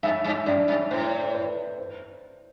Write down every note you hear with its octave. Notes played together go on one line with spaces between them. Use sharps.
G2 E5
G2
F#2 D5
G2
A2 C5
B4
C5